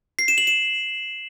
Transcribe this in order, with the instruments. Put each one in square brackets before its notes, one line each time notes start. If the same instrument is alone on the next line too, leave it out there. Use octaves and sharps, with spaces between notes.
[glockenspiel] C7
E7
F#7
E7